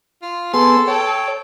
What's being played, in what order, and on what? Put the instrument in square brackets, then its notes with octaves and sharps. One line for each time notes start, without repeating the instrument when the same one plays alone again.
[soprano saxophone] F4
[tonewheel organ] B3 G#4 [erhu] A4 [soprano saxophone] C6
[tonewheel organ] C#5 [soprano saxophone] G5